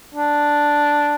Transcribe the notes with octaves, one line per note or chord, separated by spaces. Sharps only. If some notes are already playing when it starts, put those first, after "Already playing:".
D4